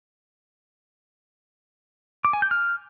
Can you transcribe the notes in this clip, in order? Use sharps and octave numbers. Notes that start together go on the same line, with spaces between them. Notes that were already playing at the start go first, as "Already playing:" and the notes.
D6
G#5
G6
F6